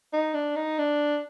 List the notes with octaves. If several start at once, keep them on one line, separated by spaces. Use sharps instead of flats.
D#4
D4
D#4
D4